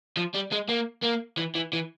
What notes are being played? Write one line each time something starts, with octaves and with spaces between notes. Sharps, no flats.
F3
G3
G#3
A#3
A#3
E3
E3
E3